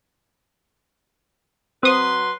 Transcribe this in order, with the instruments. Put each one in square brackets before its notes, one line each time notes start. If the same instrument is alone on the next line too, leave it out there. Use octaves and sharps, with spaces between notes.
[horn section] F#3 B4 C6 [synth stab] C4 D#6